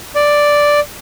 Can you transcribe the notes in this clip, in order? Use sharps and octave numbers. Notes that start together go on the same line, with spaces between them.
D5